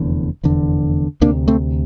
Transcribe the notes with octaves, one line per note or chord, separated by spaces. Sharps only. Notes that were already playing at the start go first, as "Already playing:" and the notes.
Already playing: F1 E2 D3
F1 E2 D3
D2 C3 A#3 D4
A3 C4